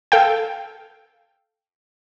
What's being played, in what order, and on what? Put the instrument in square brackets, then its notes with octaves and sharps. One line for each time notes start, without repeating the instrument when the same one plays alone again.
[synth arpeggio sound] A4 F5 G5